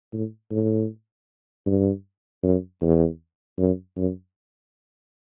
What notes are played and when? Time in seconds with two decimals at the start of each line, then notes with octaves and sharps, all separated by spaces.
0.13 A2
0.51 A2
1.66 G2
2.43 F#2
2.82 E2
3.59 F#2
3.97 F#2